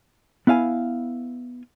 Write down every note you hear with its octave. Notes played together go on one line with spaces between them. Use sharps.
B3 E4 F5 G#5